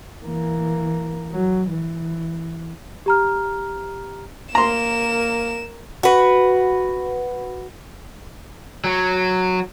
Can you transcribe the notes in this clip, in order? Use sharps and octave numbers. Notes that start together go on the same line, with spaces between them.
E3 A#3
F#3
E3
G4 A#5 F6
A#3 A#4 A#5 C6 E7
F#4 B4
F#3